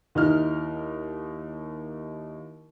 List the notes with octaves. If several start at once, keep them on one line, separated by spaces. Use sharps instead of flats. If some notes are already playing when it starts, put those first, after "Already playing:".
D#2 D#4 E4 F6